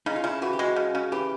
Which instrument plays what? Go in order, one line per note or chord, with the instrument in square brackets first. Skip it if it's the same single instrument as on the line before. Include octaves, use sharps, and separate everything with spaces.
[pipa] C#3 [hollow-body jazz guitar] D#4
[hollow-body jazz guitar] F4
[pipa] C#3 [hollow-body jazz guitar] E4
[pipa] E3 [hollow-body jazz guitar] F#4
[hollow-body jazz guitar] G4
[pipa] G#3 [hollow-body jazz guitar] F#4
[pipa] C#3
C#3
[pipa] E3 [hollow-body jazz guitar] G4